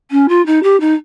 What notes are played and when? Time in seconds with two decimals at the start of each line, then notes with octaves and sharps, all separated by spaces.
0.11 C#4
0.28 F4
0.46 D#4
0.63 G4
0.80 D#4